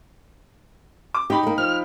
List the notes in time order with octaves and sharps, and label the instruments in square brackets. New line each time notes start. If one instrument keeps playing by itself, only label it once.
[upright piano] D6
[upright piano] D#4 G5 B5 [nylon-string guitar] G4
[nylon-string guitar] G#3 A#3
[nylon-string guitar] F3 [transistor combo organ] F6